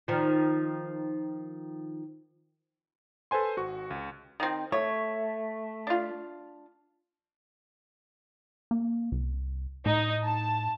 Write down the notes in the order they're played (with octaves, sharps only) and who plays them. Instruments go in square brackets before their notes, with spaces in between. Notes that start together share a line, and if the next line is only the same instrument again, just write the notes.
[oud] D#3 F3
[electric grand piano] A4 B4 C5 G#5 C6
G#1 F#4 C#6
C#2
[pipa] D#3 C4
[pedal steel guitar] A3 [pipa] C#5
[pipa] D4 F4
[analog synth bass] A#3
C2
[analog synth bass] A2 [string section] D#4
[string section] A5